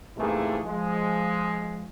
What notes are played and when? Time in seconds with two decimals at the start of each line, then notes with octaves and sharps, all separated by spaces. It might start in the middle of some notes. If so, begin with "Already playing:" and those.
0.17 G#2 C3 E3 A3 A#3 G#4
0.65 F3 G#3